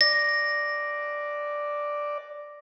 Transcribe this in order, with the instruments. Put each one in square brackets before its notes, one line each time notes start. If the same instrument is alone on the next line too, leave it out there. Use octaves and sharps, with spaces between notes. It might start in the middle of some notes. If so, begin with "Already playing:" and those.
[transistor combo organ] D5 [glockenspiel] A#6